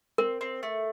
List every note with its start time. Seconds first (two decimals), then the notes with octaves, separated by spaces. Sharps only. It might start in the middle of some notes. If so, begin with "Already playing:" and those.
0.18 C4 A#4
0.41 C4
0.63 A3